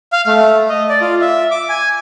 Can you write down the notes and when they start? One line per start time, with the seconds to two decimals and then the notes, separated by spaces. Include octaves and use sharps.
0.13 F5
0.27 A3
0.69 D#5
0.89 D5
1.01 F4
1.21 E5
1.51 D6
1.69 G#5